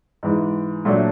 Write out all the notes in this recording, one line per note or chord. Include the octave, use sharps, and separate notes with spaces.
G#2 E3 G#3
A#2 F#3 A3 D4